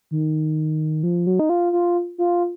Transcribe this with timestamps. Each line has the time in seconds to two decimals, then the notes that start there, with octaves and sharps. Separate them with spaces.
0.11 D#3
1.03 F3
1.27 F#3
1.39 D#4
1.49 F4
1.73 F4
2.18 F4